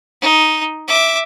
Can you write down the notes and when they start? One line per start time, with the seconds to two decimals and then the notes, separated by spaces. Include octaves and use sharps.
0.21 D#4
0.87 E5 D6